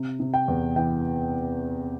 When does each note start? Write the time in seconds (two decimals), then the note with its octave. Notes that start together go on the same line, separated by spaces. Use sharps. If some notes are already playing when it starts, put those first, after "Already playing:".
Already playing: C3
0.20 C3
0.34 G5
0.48 E2
0.76 E3 G5